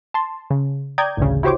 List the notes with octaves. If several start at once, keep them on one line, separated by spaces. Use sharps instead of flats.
A5 C6
C#3
D5 G5 A#5 D#6 G6 G#6
A1 D2 C#3
E4 F#4 G4 C5 C#5 D6